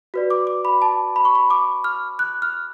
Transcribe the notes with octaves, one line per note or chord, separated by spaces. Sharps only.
F#4 B4 D5
D6
D6
B5
A5
B5
C#6
B5
D6
F6
F#6
F6